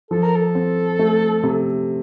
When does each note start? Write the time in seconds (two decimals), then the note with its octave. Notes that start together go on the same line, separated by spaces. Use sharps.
0.11 F3 A4
0.23 A#4
0.36 A4
0.55 C4
0.99 A3
1.43 C3